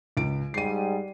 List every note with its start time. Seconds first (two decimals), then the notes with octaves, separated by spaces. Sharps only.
0.17 C#2 D7
0.54 G#2 G3 C7 D#7